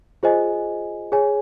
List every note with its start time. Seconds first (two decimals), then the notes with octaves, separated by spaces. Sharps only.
0.23 F4 G#4 C5 D#5 G#5
1.12 G#4 C#5 G#5